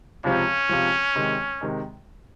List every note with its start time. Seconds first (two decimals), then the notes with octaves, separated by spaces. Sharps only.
0.24 C#2 C3 F3 C#4
0.69 C#2 C3 F3
1.15 C3 D#3 G#3
1.61 C3 D#3 G#3